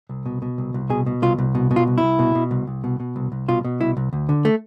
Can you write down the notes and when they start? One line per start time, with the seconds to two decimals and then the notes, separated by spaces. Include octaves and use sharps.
0.09 C2
0.26 B2
0.42 B2
0.58 C2
0.74 C2
0.90 B2 G#4
1.06 B2
1.22 C2 F4
1.38 C2
1.55 B2
1.71 B2
1.76 F4
1.87 C2
1.98 E4
2.03 C2
2.19 B2
2.35 B2
2.51 C2
2.67 C2
2.84 B2
3.00 B2
3.16 C2
3.32 C2
3.48 B2 F4
3.65 B2
3.81 C2 E4
3.97 C2
4.13 D2
4.29 D3
4.45 A3